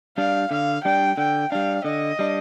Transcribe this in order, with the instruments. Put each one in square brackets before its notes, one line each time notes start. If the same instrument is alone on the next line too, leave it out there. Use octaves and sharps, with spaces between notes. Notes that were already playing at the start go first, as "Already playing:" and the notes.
[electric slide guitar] G3 D4 [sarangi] F5
[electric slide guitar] D3 [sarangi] F5
[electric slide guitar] G3 D4 [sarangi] G5
[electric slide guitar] D3 [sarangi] G5
[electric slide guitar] G3 D4 [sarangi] F5
[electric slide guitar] D3 [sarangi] D#5
[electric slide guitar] G3 D4